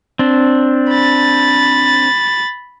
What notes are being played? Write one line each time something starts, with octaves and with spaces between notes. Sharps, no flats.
C4 D4
B5 A6